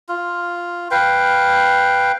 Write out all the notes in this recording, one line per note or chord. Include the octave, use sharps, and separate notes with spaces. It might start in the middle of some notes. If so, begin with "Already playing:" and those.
F4
B4 F5 G5